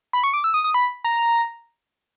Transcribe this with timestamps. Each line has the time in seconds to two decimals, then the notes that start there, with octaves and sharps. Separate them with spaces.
0.13 B5
0.24 C#6
0.34 D6
0.44 E6
0.54 D#6
0.64 D#6
0.74 B5
1.04 A#5